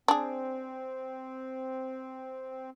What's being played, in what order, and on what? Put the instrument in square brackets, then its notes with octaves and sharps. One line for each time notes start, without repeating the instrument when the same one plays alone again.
[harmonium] C4 [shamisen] D4 G#4